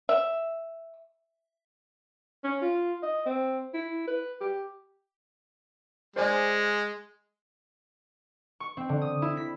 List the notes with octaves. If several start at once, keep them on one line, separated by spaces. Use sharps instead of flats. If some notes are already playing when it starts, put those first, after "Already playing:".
E5
C#4
F4
D#5
C4
E4
B4
G4
G#3 C5 D5 G#5
C#6
C4
D3
D#6
E4
B6